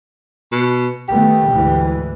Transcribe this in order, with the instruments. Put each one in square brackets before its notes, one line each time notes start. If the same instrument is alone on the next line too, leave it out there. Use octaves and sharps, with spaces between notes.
[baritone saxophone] B2
[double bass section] D#3 A3 B3 [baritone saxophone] G4
[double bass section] D2 G#2 E3